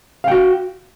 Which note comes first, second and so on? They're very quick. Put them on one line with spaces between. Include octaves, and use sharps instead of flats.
F5 G5 F#4